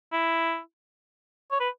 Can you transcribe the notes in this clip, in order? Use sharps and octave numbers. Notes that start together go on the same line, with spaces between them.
E4
C#5
B4